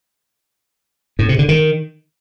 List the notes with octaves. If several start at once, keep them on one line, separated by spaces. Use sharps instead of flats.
A2
C3
D3
D#3